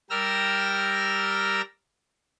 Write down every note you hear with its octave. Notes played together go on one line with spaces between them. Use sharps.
G3 A#4 G5 E6 F6 A#6